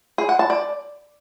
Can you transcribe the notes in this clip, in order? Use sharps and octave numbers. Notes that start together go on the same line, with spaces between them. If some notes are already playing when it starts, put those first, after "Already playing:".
G#4
F#5
A5
D5